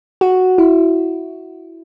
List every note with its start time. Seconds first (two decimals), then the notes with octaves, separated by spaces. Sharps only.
0.21 F#4
0.58 E4